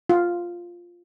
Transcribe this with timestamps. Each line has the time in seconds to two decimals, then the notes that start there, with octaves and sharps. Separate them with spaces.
0.09 F4